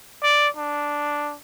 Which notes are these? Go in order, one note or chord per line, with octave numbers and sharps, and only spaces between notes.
D5
D4